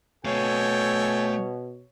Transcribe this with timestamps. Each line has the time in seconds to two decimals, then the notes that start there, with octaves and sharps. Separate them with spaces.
0.25 B2 A3 A4 C#5 F5 G5 G#5